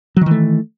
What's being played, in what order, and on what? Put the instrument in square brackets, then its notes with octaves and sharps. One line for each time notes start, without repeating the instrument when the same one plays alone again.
[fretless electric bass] F#3
D#3
E3
A3